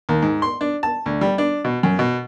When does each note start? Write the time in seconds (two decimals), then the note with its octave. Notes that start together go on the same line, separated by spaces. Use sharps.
0.09 D#2
0.22 G#2
0.42 C6
0.61 D4
0.83 A5
1.06 D2
1.21 G3
1.38 D4
1.65 B2
1.83 F#2
1.99 B2